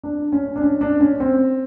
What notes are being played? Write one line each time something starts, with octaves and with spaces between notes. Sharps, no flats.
D4
C#4
D4
C#4
D4
C#4
C4